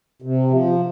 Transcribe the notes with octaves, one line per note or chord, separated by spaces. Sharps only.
C3
F3